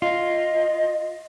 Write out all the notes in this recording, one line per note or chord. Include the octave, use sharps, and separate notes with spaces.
F4 D#5